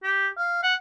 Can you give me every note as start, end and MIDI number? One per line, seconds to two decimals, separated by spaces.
0.03 0.27 67
0.38 0.63 77
0.63 0.74 78